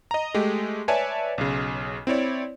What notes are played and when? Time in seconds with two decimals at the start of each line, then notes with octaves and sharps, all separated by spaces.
0.11 D#5 A#5
0.34 G#3 A3 G4
0.88 B4 C#5 D5 E5 G#5 A5
1.38 B1 C#3
2.07 C4 E4 C#5 D5